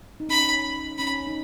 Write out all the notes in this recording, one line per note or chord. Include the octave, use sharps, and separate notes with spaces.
D#4
C#4 B5
C#4 B5
D#4